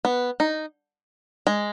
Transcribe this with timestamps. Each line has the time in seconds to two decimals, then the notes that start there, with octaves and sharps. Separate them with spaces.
0.05 B3
0.40 D#4
1.47 G#3